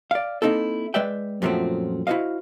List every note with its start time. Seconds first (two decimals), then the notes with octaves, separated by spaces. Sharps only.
0.11 D5 F5
0.42 A#3 C4 D#4 E4 A4
0.94 G#3 B4 D5 E5 G5
1.42 F#2 A#2 F3 F#3 A3 C4
2.07 E4 F#4 G#4 C5 D#5 F5